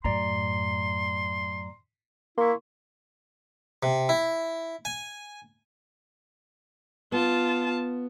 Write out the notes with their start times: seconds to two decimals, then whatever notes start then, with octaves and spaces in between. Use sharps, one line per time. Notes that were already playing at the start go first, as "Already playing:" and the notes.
0.04 F#2 A2 D5 A#5 C6
2.38 A#3 E4 C6 C#6
3.83 C3
4.09 E4
4.85 G#5
7.12 B3 F4 A5